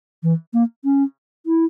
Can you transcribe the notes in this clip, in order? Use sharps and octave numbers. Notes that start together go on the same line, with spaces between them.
E3
A#3
C#4
E4